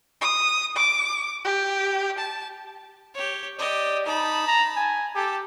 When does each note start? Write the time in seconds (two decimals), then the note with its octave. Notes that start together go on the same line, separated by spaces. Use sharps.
0.21 D#6
0.77 D6
1.45 G4
2.18 A5
3.15 G4 C#5
3.59 G4 D5 D#5
4.06 D#4 A5 B5
4.47 A#5
4.76 G#5
5.15 G4 A4 A5